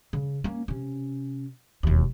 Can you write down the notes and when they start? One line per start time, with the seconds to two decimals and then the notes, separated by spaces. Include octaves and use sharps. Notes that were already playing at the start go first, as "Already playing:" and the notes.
0.13 C#3
0.44 A#3 C#4
0.68 C3 C#4
1.83 E1 D#2